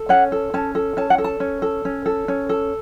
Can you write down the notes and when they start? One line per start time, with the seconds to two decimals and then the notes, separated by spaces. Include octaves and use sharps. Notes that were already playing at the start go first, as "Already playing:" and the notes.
Already playing: A4
0.09 C#4 F#5
0.32 A4
0.54 C#4 A5
0.75 A4
0.97 C#4 A5
1.10 F#5
1.18 A4
1.24 A5
1.40 C#4
1.62 A4
1.85 C#4
2.06 A4
2.28 C#4
2.49 A4